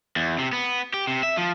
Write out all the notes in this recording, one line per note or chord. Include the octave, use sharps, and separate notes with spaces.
E2
C3
B3
G4
C3
E5
F3